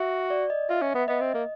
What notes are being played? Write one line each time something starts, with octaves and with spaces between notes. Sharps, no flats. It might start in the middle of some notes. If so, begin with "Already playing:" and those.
Already playing: F#4 E5
D5
D#5
F4 E5
C#4
B3
E5
B3 D#5
C4
A#3